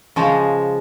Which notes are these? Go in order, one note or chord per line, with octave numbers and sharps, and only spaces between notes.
C#3 F3 G#3